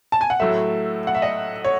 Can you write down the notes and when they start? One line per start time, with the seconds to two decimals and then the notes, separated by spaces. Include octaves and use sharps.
0.12 A5
0.21 G#5
0.30 F#5
0.40 A2 F#3 A3 E5
1.07 F#5
1.15 E5
1.22 D#5
1.64 C#5